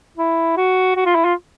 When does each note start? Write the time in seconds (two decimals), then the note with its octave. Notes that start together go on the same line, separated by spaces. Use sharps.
0.17 E4
0.57 F#4
0.96 F#4
1.05 F4
1.15 E4
1.24 F4